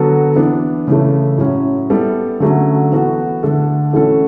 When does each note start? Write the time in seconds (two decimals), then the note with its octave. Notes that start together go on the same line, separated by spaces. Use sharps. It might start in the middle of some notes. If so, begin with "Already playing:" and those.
Already playing: D3 F#3 B3 F#4 A4
0.36 E3 B3 D4
0.88 C#3 E3 A3
1.38 A2 F#3 C#4
1.90 G3 B3 E4 A4
2.40 D3 F#3 A3 C#4
2.92 E3 B3 F#4 A4
3.43 D3 A3 D4 A4
3.93 E3 A3 C#4 F#4 A4